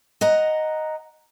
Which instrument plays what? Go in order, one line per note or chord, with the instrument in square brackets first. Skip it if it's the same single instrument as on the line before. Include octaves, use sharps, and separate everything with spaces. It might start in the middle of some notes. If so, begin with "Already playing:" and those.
[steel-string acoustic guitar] D#5 F#5 A#5